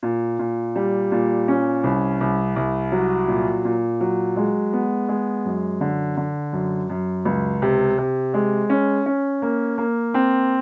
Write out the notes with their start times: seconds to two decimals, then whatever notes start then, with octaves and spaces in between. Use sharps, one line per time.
0.03 A#2
0.39 A#2
0.76 G3
1.12 A#2
1.48 C#4
1.84 C2
2.20 C2
2.56 C2
2.92 F#3
3.28 A#2
3.65 A#2
4.01 F#3
4.36 G#3
4.73 B3
5.09 G#3
5.45 F#2
5.81 D3
6.17 D3
6.53 F#2
6.90 F#2
7.25 C#2
7.62 C3
7.98 C3
8.34 G#3
8.70 C#4
9.06 C#4
9.42 A#3
9.78 A#3
10.14 C4